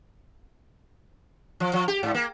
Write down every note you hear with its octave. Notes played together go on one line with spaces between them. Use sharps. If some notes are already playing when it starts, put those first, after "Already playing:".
F3
F3
G4
G#2
A#3